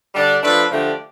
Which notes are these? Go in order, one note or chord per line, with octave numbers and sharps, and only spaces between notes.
D3 G3 D4
F3 A3 D4 F4 B4
D3 F3 A3 D4 G4